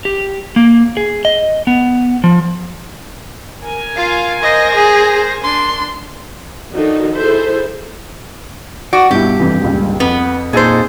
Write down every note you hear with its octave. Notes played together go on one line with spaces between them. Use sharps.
G4
A#3
G#4
D#5
B3
F3
A#4 G#5
F4 F5
C5 D#5 A#6
G#4
D4 C6
D#3 F3 D4 D#4 F#4 A4
E4 G#4 A4 C5 E5
F#4 D5
G2 B2 E4 G4
F2 E3
D#1 C#2
F2 B3
A#2 D#4 G#4 A4 C5